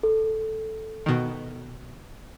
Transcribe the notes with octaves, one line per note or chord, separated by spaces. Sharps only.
A4
B2 D#3